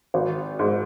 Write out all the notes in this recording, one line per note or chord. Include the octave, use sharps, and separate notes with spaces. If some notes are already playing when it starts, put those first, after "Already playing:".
G#1
G#2